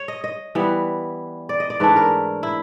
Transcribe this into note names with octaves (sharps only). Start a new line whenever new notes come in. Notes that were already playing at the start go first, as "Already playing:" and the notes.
Already playing: C#5
D#5
D#5
E3 G3 B3
D5
D#5
D5
G#2 E3 A3 D4 B4
A#4
E4